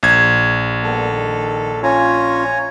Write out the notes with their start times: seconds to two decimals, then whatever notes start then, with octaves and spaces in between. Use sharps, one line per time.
0.03 A#1 G#6
0.83 G3 A#3 B3 A4
1.08 D#3
1.83 C#4 F4 C#5 G#5 A#5